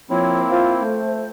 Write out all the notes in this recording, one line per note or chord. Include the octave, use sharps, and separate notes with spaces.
F3 A#3 C4 E4 C#5
F4 C5
A3